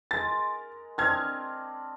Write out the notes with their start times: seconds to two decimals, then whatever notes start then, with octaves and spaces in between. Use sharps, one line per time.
0.11 G#3 A#4 A6
0.98 C4 D4 D#5 F6 G#6